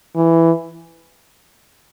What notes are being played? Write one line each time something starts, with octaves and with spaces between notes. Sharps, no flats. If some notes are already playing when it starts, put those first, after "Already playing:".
E3